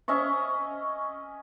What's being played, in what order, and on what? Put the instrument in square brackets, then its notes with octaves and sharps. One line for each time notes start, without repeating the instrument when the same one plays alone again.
[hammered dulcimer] C#4 D#5 E5 C#6